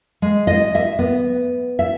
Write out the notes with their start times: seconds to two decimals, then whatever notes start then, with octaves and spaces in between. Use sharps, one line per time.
0.22 G#3
0.47 D#5
0.75 E5
0.99 B3
1.79 E5